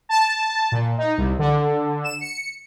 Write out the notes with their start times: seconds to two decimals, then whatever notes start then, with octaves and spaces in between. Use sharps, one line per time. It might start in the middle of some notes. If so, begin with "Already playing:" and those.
0.09 A5
0.72 A#2
0.98 D#4
1.18 C2
1.39 D3
2.04 E7
2.21 C#7